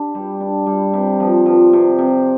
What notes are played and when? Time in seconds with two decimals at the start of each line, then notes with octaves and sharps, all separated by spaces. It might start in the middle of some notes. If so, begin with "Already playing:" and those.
Already playing: D4 G4
0.15 G3
0.41 D4
0.66 G3
0.93 C3
1.20 F3
1.46 F3
1.73 C3
1.99 C3